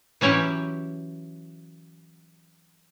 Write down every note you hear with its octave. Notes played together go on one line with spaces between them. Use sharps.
E3 F#3 C#4 E4 G4